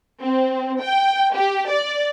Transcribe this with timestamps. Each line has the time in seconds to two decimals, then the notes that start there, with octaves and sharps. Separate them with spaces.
0.21 C4
0.80 G5
1.35 G4
1.70 D5